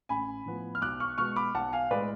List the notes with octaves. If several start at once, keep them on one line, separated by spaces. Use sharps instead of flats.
A1 G#5 B5
A2 F3 B3
F6
B1 D6 F#6
C#6 F6
B2 G#3 B3 C#6 F6
B5 D6
B1 F#5 A5
F5 G#5
A2 G#3 B4 D5